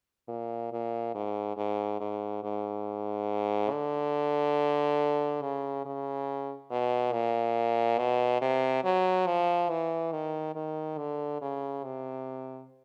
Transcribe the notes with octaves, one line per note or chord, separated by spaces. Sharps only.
A#2
A#2
G#2
G#2
G#2
G#2
D3
C#3
C#3
B2
A#2
B2
C3
F#3
F3
E3
D#3
D#3
D3
C#3
C3